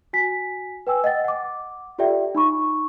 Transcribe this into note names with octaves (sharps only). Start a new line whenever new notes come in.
F#4 G#5 B6
B4 G5 G#5 E6
D#5 F#5 G5 A6
F#5 D6
F4 G4 A4 D5 E5 G5
D#4 B5 C#6